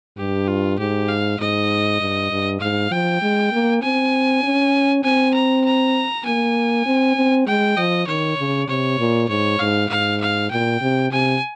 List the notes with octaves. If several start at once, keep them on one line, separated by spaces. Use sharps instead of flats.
G2 G4
F4
G#2 G4
F5
G#2 D#5
G2
G2
G#2 F5
F3 G5
G#3
A#3
C4 G#5
C#4
C4 G#5
A#5
A#5
A#3 G#5
C4
C4
G#3 G5
F3 D#5
D#3 C#5
C#3
C3 C#5
A#2
G#2 C#5
G#2 F5
G#2 F5
F5
A#2 G5
C3
C3 G#5